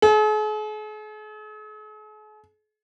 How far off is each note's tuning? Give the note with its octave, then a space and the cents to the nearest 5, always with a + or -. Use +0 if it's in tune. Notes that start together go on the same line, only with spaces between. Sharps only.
G#4 +45